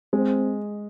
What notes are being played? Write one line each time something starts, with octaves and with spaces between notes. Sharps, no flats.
G#3 C4